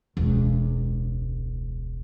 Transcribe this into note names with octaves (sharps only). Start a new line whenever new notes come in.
E1 C#2